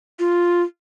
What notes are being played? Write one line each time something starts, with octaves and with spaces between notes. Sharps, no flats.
F4